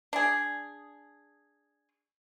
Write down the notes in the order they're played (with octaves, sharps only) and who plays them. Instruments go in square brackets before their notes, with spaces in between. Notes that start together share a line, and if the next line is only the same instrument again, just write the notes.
[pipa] D4 G#4